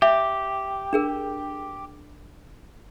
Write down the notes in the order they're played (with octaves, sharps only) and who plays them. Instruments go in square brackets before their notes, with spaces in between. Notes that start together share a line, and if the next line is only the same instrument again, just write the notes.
[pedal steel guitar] G4 [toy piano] E5
[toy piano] D4 G#4 A#4